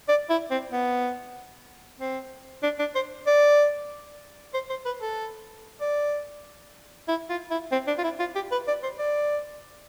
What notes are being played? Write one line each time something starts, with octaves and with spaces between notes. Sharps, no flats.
D5
E4
C4
B3
C4
D4
D4
C5
D5
C5
C5
B4
A4
D5
E4
F4
E4
C4
D4
F4
E4
F4
G4
B4
D5
C5
D5